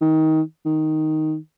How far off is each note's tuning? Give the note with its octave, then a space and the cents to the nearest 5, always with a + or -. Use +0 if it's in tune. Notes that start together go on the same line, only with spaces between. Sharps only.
D#3 +20
D#3 +0